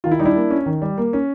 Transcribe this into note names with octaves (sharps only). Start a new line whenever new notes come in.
D#3 F4
E4
G3 D#4
D4 E4
A#3
C#4
D#3
G3
A#3
C#4